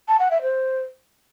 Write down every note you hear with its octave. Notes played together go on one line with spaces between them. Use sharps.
A5
F#5
E5
C5